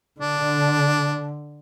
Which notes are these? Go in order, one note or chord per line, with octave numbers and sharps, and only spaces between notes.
D3 D4